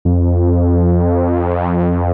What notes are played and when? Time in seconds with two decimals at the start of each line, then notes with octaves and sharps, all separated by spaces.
0.05 F2